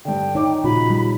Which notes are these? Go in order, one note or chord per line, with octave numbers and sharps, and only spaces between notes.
G2 D3 G5
D#4 C#5 D6
A#2 C#3 F3 F#4 B5
G3